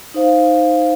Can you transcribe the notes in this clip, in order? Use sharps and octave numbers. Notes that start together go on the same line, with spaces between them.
D#4 C5 F5